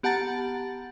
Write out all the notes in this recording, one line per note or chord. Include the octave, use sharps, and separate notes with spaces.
B3 G4 F#5 A5 A#5 A6